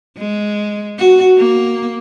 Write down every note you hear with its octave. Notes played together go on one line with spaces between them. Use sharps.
G#3
F#4
A#3